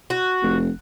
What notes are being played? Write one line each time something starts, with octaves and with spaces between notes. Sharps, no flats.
F#4
F1